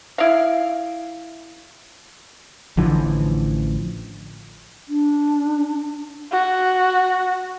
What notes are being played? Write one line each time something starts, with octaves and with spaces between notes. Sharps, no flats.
E4 F5
A1 D3 E3 F3
D4
F#4